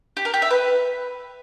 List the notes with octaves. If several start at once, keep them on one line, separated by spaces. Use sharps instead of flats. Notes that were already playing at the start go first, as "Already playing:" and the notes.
G4
A#4
G4
E5
B4